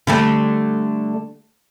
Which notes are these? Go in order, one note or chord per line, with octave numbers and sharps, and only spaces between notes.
D3 G3 A3